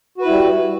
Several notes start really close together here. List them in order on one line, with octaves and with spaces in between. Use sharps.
F#4 B4 E4 G3